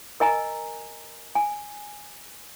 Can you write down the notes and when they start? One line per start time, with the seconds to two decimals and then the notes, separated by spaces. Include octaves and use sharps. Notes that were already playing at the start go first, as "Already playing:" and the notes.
0.20 A#4 D#5 G#5 A#5
1.35 G#5